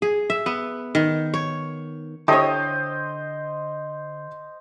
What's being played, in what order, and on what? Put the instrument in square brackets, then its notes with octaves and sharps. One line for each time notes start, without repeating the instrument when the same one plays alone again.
[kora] G#4
E5
B3
D#3
C#5
[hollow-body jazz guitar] D3 C#5 [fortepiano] E4 G4 A4 [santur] C5 D#5 D#6